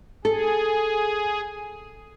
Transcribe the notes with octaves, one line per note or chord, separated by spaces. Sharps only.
G#4 A4